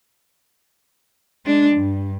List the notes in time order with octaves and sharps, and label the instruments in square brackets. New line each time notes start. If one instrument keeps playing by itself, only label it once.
[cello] G#3 D4
G2